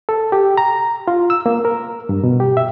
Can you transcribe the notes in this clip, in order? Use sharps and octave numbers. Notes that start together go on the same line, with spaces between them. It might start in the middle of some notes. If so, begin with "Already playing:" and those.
A4
G4
A#5
F4
E6
A#3
A#4
G2
B2
G4
E5